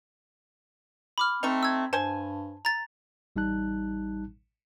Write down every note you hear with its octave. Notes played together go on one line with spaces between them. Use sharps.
B5 D6 F6
A3 C4 D#4 A#5
E6 G#6
G2 C5 G#5 A5
A#5 A6
A1 G3 D#4 A5 F#6